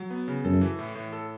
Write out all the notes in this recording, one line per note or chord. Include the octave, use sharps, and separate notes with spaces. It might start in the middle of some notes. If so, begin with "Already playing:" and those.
Already playing: F#3
B3
C#3
F#2 A4
E3
A2
A2
A4